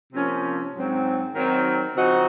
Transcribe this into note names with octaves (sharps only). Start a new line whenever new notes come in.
C3 F3 A#3 C#4
G#2 F#3 C4
D#3 F#3 C4
C#3 F3 C4 D#4 F#4